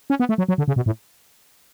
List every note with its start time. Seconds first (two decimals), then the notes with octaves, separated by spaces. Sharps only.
0.10 C#4
0.20 B3
0.29 A3
0.38 F#3
0.48 F#3
0.58 D3
0.68 C#3
0.76 B2
0.86 A2